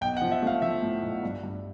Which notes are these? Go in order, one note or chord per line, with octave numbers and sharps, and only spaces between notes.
B1 G5
F#5
F3
E5
A3 F5
F3 E5
A2
B1
G2
G2